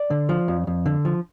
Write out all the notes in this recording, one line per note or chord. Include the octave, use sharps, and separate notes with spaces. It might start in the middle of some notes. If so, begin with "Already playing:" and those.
Already playing: D5
D3
F3
F2
F2
D3
F3